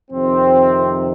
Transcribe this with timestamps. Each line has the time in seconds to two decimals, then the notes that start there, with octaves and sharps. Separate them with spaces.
0.11 F2 C3 D#3 C4